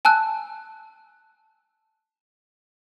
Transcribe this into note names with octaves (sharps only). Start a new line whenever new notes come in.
G#5 A5 E6 F#6